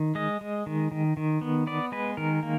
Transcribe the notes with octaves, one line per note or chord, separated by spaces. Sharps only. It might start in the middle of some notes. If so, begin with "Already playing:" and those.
Already playing: D#3
G#3 D#5
G#3
D#3
D#3
D#3
B3
B3 D5
G#3 B4
D#3 A#4
A#3